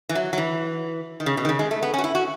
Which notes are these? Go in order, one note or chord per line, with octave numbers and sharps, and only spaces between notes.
E3
F#3
F#3
E3
D#3
C#3
B2
D#3
C#3
G#3
A3
B3
C#4
F#4
E4
F#4